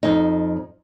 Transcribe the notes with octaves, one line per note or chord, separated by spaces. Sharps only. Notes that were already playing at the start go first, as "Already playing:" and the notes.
F2 D#4